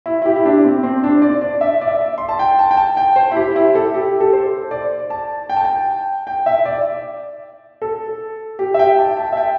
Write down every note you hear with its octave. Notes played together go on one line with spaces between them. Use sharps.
E4
E4
G4
E4
D4
C4
C4
D4
D5
D5
E5
D5
E5
C6
A5
G5
A5
G5
A5
G5
C5
E4
G4
E4
A4
G4
A4
C5
D5
A5
G5
A5
G5
G5
E5
D5
A4
G4
E5
G5
A5
A5
E5
G5